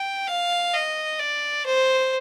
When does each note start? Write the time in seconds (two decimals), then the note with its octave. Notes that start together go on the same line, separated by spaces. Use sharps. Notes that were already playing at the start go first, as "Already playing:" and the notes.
Already playing: G5
0.27 F5
0.74 D#5
1.19 D5
1.66 C5